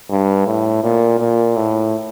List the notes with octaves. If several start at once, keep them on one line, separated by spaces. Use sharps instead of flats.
G2
A2
A#2
A#2
A2